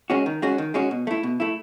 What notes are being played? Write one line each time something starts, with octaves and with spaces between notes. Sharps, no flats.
G#3 C#4 F#4
D#3
G#3 C#4 F#4
D#3
G#3 C#4 F#4
B2
A3 E4
B2
A3 E4